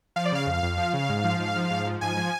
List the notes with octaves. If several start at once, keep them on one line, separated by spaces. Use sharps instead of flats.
F3 F5
D5
C#3 F5
F2
F2
F3
C#3
G#2
F3
G#2
F3
G#2
F3
G#2 G#5
F3